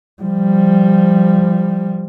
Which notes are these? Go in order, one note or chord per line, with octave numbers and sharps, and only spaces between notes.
F3 G3